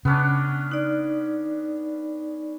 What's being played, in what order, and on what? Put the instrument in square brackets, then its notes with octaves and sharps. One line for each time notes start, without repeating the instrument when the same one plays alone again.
[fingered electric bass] C#3 [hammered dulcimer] B3 C#4 D4
[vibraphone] D#4 D5